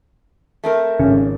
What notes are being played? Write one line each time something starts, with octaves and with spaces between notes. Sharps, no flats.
A3 C4 A#4
G#1 C#3